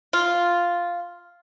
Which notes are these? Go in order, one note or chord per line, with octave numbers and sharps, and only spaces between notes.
F4